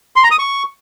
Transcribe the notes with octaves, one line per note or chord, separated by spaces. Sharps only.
C6
A#5
D#6
C#6